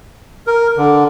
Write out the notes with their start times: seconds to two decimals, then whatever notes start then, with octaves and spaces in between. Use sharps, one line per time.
0.47 A#4
0.77 D3